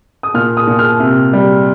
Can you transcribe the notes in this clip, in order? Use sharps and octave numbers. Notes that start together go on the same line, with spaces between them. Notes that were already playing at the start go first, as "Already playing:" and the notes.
D#6
A#2 F6
D#6
A#2
F6
C3
G3